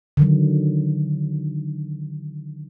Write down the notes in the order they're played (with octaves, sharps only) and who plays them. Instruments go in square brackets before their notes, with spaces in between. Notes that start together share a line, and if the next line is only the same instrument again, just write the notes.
[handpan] D3 D#3 F#3